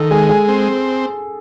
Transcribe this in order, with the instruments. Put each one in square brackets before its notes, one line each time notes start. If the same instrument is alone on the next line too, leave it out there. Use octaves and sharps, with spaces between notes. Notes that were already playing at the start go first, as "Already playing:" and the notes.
Already playing: [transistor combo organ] D#3 [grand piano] A4
[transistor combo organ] G#3 [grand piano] G#4
[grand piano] G#4
[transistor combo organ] C4